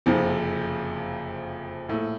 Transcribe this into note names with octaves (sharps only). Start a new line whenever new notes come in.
F#1 F2 C3 F3
A#1 A2 A3